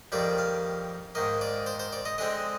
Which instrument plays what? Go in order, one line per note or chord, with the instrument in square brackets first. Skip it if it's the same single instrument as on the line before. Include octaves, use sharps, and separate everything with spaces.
[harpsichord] F2 D#3 G3 A#3 D5
F5
G#2 D#3 A#3 D#5
D5
C5
C5
D5
D#5
D3 G#3 C4 D#5